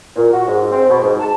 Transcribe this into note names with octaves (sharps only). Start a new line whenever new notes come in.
A#2
F#4
G#2
C4
B2
G#2
A5